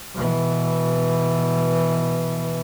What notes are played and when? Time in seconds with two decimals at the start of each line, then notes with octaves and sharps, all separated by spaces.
0.14 B2 E3